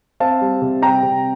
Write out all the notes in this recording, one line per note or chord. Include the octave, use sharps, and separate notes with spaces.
C4 F5 A5
G3
C3
G3 G5 A#5
C3